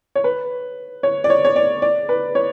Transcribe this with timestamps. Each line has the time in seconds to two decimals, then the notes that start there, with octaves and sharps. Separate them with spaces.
0.15 C#5
0.24 B4
1.03 C#5
1.24 D5
1.30 C#5
1.45 C#5
1.56 D5
1.82 D5
2.09 B4
2.35 C#5